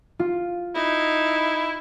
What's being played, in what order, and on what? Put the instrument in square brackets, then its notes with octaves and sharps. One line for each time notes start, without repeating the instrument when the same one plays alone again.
[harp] F4
[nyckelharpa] D#4 [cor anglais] E4